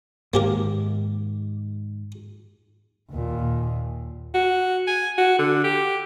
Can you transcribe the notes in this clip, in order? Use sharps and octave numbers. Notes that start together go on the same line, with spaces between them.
G#2 D#3 A#3 G4 A#4
D#2 A#2
F#4
G#5
F#4
D3
G4